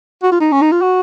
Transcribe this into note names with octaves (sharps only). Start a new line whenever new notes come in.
F#4
F4
D#4
C#4
D#4
F4
F#4